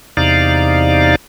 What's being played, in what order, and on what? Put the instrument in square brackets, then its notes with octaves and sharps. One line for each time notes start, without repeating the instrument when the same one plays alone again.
[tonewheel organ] E2 C3 D#4 D5 F5